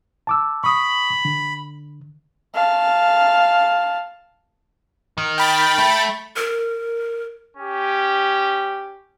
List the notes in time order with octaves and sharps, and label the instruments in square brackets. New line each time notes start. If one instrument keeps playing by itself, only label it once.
[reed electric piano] A5 D6 E6
[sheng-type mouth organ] B5 [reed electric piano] C#6 D#6
[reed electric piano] D3
[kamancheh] F5 A5
[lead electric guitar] D#3
[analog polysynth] G5 B5 A6
[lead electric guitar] A3
[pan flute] A#4
[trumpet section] C#4 G4